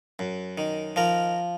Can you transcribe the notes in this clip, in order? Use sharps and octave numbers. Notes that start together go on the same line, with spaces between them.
F#2
D#3
F3 A#4